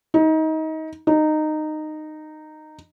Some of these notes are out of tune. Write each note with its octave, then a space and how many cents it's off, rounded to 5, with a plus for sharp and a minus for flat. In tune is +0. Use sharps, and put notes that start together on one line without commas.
D#4 +25
D#4 -15